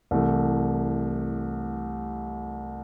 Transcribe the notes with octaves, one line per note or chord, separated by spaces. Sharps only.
C2 C3 E3 A3